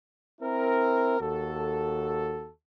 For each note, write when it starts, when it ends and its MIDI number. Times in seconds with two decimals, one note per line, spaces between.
0.42 1.18 60
0.42 1.18 64
0.42 1.18 70
1.20 2.50 39
1.20 2.50 66
1.20 2.50 69